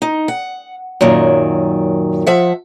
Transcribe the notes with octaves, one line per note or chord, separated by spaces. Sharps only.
D#4
F#5
F#2 A#2 D#3 F#3
F3 E5 F#5